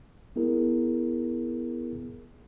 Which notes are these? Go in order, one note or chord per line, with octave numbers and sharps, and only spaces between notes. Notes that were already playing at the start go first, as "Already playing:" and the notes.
B3 E4 G#4 A#4